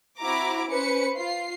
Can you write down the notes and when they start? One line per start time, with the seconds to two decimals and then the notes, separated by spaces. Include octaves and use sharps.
0.19 C4 E4 F#4 A#5 D6
0.69 C#4 B4 C5 C#7
1.16 F4 C7